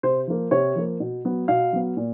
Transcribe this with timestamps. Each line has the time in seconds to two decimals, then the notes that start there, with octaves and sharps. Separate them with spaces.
0.03 C3 C5
0.27 F3 A#3
0.51 C3 C#5
0.76 F3 A#3
1.00 B2
1.25 F#3 B3
1.48 B2 F5
1.73 F#3 B3
1.97 A#2